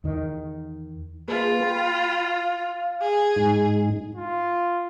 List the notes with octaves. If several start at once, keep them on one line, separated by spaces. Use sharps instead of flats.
E2 D#3
A#3 F4 G#4 B4
G5 B5
F5
G#4
G#2 G#3 D#4
F4